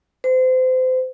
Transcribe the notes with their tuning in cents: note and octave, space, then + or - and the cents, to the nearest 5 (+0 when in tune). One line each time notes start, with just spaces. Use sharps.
C5 -30